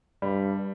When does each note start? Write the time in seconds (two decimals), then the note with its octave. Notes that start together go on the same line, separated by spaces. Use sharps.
0.22 G2 G3